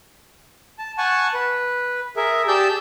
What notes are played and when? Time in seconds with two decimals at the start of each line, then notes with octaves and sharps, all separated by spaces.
0.79 A5
0.98 F#5 G#5 A5 C#6
1.34 B4
2.16 G#4 A#4 E5
2.48 G4 G#4 D5 A5 E6 G6